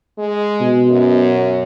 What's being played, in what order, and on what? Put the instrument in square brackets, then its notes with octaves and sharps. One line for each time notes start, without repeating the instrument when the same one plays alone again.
[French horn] G#3
[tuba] B2
[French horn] F#2